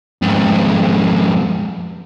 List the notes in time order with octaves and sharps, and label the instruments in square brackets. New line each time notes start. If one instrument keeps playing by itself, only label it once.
[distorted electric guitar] F2 G#2